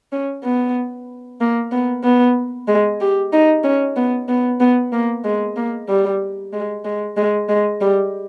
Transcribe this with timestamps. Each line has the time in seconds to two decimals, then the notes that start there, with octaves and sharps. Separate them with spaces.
0.12 C#4
0.44 B3
1.41 A#3
1.72 B3
2.04 B3
2.68 G#3
3.01 G4
3.32 D#4
3.64 C#4
3.96 B3
4.29 B3
4.60 B3
4.93 A#3
5.24 G#3
5.56 A#3
5.89 G3
6.53 G#3
6.85 G#3
7.17 G#3
7.49 G#3
7.81 G3